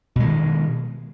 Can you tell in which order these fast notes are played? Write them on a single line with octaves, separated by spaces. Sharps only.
B2 G#3 D#3